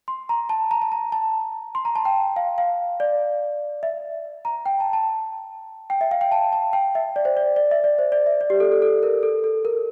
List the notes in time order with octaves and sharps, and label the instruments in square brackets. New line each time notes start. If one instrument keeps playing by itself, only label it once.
[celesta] C6
A#5
A5
A#5
A5
A#5
A5
C6
A#5
A5
G5
F5
F5
D5
E5
A#5
G5
A5
A5
G5
E5
F5
G5
A5
A5
G5
E5
D5
C5
D5
D5
E5
D5
C5
D5
E5
D5
G4
A4
A4
A4
A#4
A4
A4
A#4